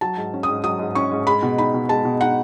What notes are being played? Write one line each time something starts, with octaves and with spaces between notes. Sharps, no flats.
F#3 A5
G#2
C#4
G#2 D#6
F#3 D#6
G#2
C#4 C#6
G#2
G#3 B5
B2
D#4 B5
B2
G#3 A5
B2
D#4 F#5